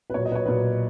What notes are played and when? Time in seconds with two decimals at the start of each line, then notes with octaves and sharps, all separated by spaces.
0.10 B4
0.14 B1 A#2 C#5
0.25 D#5
0.31 B4
0.35 C#5
0.46 B1 A#2 B4